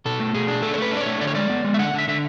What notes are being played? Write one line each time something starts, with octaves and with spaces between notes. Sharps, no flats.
B2 A4
A3
B2 G#4
D4
A3 A4
C#5
A3 B4
D4
D5
C#5
A3
D3 D5
C#5
G#3 D5
B3
G#3
E5
D3 F#5
D3 E5
D3 E5